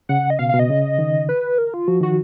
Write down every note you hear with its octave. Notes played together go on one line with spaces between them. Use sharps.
C#3 F#5
D#5
B2 F5
F5
B2
D#5
C#3
D#3
B4
A#4
F4
F3 F#4
D#3 F#4